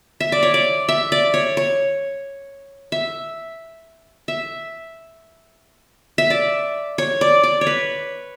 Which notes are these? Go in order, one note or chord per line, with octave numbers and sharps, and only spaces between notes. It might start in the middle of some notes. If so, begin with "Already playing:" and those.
E5
D5
C#5
D5
E5
D5
C#5
C#5
E5
E5
E5
D5
C#5
D5
D5
C#5
B4